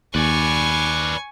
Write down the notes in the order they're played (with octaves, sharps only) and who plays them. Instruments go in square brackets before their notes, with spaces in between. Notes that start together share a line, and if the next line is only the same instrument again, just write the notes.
[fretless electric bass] D#2 [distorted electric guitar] B4 D5 [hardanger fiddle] G#5 C#6